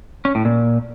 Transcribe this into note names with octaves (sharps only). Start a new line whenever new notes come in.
C#4
A2
A#2